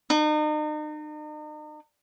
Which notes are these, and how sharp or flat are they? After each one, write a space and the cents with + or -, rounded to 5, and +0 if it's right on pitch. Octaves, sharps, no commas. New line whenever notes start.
D#4 -40